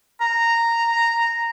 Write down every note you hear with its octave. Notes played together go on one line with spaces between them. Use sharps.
A#5